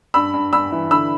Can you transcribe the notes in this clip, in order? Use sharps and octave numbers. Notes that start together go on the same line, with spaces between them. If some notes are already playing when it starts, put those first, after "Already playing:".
G2 B5 E6
G2
G2 B5 E6
E3
D3 B5 E6